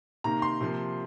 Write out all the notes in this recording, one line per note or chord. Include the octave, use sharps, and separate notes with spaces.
C3 D#3 A#3 A#5
C6
C3 F3 A#3